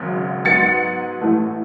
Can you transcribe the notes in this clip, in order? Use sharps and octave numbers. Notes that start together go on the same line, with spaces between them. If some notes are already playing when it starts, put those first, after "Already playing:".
Already playing: G#1 F#2 C#3
G#2 F#3 B3 A6 C#7
A1 A2 E3 A3